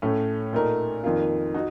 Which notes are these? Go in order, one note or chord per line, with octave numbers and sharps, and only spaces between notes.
A2 A3 C#4
A#2 A3 D#4 A#4
F2 D#3 A#3 F4
D#4 F#4